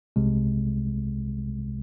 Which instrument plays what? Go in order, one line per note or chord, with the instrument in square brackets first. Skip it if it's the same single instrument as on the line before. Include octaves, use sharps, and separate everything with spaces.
[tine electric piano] C2 C3 G#3